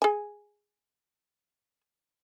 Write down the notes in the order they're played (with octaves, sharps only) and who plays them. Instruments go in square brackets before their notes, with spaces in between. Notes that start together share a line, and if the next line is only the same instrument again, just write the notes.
[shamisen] G#4 G#5